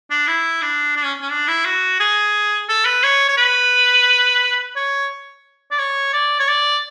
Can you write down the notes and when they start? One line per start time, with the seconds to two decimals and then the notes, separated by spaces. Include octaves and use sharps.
0.11 D4
0.28 E4
0.62 D4
0.96 D4
1.04 C#4
1.21 C#4
1.31 D4
1.48 E4
1.65 F#4
2.00 G#4
2.69 A4
2.85 B4
3.04 C#5
3.29 C#5
3.37 B4
4.76 C#5
5.71 D5
5.79 C#5
6.13 D5
6.40 C#5
6.48 D5